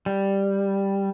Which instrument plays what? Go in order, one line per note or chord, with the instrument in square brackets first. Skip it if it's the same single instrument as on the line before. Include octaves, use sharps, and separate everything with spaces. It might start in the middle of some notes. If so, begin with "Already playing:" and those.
[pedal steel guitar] G3